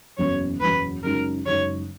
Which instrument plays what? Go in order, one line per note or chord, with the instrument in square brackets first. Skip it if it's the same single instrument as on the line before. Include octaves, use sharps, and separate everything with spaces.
[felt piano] F#1 E2 B2 F#3 C#4 [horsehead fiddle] C#5
[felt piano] F#1 E2 B2 F#3 C#4 [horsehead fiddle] B4
[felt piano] F#1 F#2 C#3 G#3 D#4 [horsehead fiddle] A#4
[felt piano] F#1 F#2 C#3 G#3 D#4 [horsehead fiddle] C#5